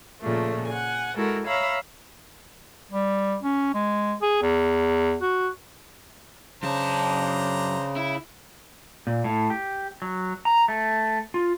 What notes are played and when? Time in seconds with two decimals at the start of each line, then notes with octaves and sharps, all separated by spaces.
0.22 A#2 C#3 F3 A3
0.67 F#5 G#5
1.15 G#3 E4 F#4 A4 A#4
1.47 C#5 E5 F5 A#5 B5
2.91 G3
3.42 C#4
3.74 G#3
4.22 G#4
4.42 E2
5.21 F#4
6.63 F#2 C#3 D4 C5 A5 A#5
7.97 E4
9.07 A#2
9.24 A2
9.50 G4
10.02 F#3
10.45 A#5
10.68 A3
11.34 F4